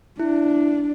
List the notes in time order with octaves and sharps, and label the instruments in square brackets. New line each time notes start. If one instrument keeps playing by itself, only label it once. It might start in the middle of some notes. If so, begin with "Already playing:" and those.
[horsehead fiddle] D4 [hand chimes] E4